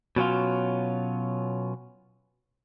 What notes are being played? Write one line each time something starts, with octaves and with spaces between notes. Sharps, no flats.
B2 F#3 C#4 F4